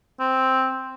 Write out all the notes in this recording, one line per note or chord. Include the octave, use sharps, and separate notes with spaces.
C4